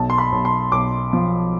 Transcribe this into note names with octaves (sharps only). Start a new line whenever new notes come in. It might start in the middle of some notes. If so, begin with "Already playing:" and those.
Already playing: B1 A5
C6
B5
B1
C6
B1 D6
F3